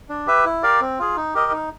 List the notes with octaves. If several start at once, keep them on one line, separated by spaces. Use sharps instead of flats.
D4
G4 B4 E5
E4
G4 A#4 D5 F5
C4
F4 G#4
D#4
G4 A#4 D#5
D#4